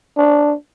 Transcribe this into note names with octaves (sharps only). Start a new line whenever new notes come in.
D4